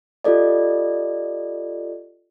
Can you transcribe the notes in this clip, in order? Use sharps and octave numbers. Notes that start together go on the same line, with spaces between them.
F4 G4 A4 D5 D#5